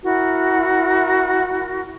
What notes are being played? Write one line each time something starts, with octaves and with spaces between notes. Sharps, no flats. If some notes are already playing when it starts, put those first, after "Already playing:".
E4 F#4 A#4